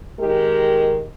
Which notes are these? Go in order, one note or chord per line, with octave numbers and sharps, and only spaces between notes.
D#3 G#3 G4 A#4